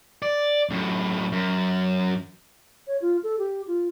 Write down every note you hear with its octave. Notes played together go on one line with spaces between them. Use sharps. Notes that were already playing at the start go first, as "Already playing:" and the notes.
D5
F#2 A2
F#2
C#5
F4
A4
G4
F4